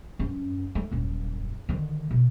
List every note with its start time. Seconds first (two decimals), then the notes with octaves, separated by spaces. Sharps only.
0.19 F#2 C#4
0.75 A3
0.91 D#1 F#2
1.69 D3 D#3
2.11 B2